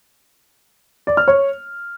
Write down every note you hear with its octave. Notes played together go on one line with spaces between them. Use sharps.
D5
F6
C#5